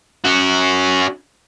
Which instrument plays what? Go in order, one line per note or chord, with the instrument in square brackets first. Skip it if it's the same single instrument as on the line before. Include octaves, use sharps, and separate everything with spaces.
[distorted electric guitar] C#4 F#4